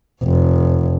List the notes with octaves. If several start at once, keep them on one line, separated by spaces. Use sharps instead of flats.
F1